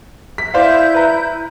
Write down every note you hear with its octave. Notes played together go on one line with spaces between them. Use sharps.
B6
E4 C5 D5 F5 G6
B4 A#5